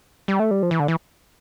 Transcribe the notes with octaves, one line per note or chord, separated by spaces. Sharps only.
G3
A3
G3
F3
E3
D3
E3